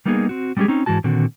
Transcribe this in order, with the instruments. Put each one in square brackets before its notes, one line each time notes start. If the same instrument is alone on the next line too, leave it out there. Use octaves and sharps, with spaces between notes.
[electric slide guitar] G3 A#3 B3 D#4 G4 G#4
C4 F#4
G3 G#3 C#4 E4 G4 G#4
C4 C#4 D#4
G#2 E3 G#3 F#4 A5
A#2 D3 D#3 C4 F#4